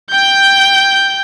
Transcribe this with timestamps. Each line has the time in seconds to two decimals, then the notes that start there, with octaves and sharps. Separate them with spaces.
0.11 G5 G6